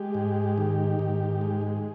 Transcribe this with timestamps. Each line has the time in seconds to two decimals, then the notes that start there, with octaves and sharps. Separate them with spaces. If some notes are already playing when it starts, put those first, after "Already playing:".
Already playing: G#3 G4
0.14 G#2
0.58 D#3
0.99 G#2
1.41 G#3